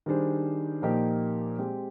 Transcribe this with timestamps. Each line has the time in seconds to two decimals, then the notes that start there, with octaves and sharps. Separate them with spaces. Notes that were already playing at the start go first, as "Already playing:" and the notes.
0.06 D#3 G3 D4 G#4 C5
0.82 A#2 F3 A#3 D#4 G4
1.58 G#3 C4 G4